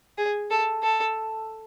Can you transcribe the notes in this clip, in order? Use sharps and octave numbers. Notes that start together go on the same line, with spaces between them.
G#4
A4
A4